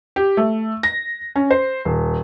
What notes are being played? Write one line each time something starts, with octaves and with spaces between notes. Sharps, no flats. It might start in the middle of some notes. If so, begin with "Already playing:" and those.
G4
A3
A#6
C#4
C5
D#1